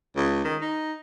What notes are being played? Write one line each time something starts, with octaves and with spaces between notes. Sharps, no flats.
C#2
D#3
D#4